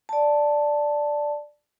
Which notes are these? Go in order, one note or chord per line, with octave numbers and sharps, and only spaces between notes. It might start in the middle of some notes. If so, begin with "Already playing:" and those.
D5 A5